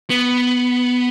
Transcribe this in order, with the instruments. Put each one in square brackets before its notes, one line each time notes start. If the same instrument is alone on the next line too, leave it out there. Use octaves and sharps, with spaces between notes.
[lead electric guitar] B3